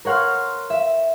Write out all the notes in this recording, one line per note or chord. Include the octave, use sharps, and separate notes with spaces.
A#4 C#5 F#5 C6 F6
E5